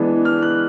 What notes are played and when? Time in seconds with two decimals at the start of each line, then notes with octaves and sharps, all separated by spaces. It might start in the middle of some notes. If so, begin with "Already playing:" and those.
Already playing: E3 G#3 B3 D4
0.25 F6
0.42 F#6